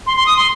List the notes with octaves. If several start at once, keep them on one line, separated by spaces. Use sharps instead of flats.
C6
C6
D#6
C6